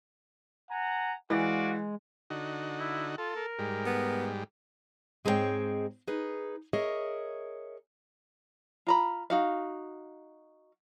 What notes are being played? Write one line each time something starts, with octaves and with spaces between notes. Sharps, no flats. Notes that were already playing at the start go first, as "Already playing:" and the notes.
F#5 G#5 A#5
E3 G#3 F#4 D5 F5
D3 D#4 F#4
E4
F4 A4
A#4
G#2 G3
B3
G#2 G#3 C4 A#4 C#5 G5
D#4 G#4 B4
G#4 A#4 C#5 D#5 E5
F4 A#5 B5
D#4 F#4 F5